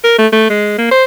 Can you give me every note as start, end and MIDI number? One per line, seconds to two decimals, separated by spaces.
0.04 0.18 70
0.19 0.27 57
0.33 0.49 57
0.50 0.74 56
0.78 0.91 58
0.92 1.05 72